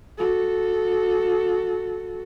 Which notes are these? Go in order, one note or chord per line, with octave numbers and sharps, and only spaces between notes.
F#4 A4